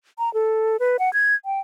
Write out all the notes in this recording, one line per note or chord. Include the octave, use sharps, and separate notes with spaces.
A#5
A4
B4
F#5
G#6
G5